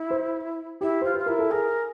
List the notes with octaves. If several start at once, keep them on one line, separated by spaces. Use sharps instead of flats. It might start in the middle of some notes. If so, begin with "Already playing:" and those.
Already playing: E4
C5
E4 G4
F4 C5
B4
F4
E4 A#4
A4
G#4 A#4